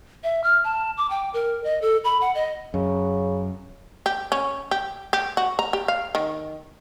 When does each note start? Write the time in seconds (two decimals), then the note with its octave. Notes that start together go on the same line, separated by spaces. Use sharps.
0.24 E5
0.44 F6
0.64 A5
0.97 D6
1.10 G5
1.34 A#4
1.64 D#5
1.82 A4
2.04 B5
2.21 F#5
2.35 D#5
2.74 F#2 C#3
4.06 G4
4.32 C#4
4.71 G4
5.13 G4
5.37 F#4
5.59 A#5
5.73 G4
5.88 F5
6.15 D#3